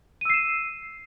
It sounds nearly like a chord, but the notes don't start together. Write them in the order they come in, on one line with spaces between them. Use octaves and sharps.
D#7 E6 C7 E7